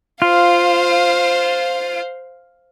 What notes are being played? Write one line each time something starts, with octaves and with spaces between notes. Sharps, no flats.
F4 C5 F5